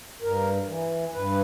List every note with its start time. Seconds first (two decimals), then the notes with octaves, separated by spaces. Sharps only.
0.22 G2 A#4
0.68 E3
1.14 G2 B4